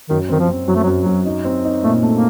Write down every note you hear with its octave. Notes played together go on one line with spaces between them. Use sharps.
F#2 D#3
D#3 C4
F3
C4
F#2 F#3
A3
F#3
F#2
F#3
F#2
D#4
C4
D#4
A#2 A3
A3
A#3